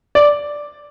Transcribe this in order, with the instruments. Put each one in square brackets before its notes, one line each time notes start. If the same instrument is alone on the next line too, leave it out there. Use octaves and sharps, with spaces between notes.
[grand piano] D5